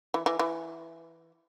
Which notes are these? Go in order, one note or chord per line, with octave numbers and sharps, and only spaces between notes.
E3
E3
E3